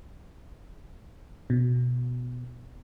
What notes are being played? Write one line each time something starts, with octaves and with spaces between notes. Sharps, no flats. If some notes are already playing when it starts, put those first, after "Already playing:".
B2